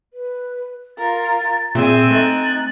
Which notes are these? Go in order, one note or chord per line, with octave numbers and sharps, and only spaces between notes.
B4
F4 A#4 A6
A#2 C4 G#4 E5 G#5
A3 D#4 F#6 A6